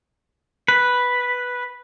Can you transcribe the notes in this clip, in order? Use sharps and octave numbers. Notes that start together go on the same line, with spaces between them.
B4